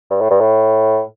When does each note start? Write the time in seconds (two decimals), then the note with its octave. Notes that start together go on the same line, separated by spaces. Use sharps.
0.10 G2
0.21 A2
0.30 G2
0.40 A2